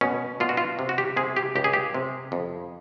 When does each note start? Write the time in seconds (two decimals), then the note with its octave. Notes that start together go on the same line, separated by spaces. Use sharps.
0.01 B2 C#4
0.40 B2 F4
0.49 F#4
0.57 F4
0.79 C3
0.89 F#4
0.98 G4
1.17 C3 G#4
1.37 G4
1.55 C#2 G4
1.64 G#4
1.73 G4
1.94 C3
2.32 F2